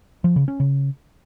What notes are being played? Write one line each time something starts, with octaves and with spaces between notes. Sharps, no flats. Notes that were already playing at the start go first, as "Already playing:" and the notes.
F3
C#3
C#4
C#3